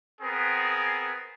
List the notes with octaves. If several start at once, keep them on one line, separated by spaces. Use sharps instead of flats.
B3 C4 G#4 A#4